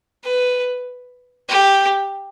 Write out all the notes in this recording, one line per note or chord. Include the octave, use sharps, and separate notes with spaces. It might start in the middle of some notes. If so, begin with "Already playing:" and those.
B4
G4